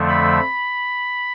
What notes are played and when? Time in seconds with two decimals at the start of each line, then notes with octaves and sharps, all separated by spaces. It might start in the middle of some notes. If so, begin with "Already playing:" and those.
Already playing: F2 D3 F3 A3
0.09 B5